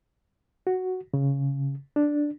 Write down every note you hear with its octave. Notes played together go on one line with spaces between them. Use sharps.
F#4
C#3
D4